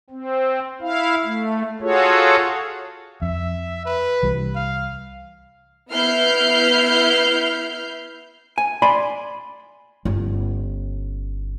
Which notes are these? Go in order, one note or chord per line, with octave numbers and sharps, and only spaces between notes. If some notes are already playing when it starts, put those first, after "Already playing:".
C4
E4 F5
A3
F4 F#4 G#4 A4 C#5
F2 E5
B4
C2 E3 G3
F5
B3 E4 E5 F6 G6 C7
G#5
D5 G#5 B5 C6
G1 C#4